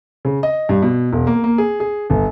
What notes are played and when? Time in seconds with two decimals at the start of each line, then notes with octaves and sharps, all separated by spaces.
0.25 C#3
0.43 D#5
0.69 G2
0.82 B2
1.12 E1
1.27 A#3
1.44 A#3
1.58 G#4
1.80 G#4
2.10 G1